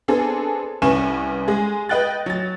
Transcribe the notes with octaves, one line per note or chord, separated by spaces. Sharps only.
B3 C4 D4 G#4 A4
C2 C#4 B4 G#5 C#6 E7
G#3 G#4
B4 D#5 G5 F#6 A6
F#3 A6